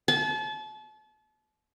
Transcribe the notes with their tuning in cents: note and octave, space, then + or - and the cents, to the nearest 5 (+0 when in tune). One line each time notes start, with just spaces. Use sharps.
A5 -35